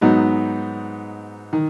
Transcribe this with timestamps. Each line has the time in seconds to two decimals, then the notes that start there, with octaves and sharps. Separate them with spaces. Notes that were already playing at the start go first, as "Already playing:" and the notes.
0.01 G#2 F#3 B3 D#4
1.53 D#3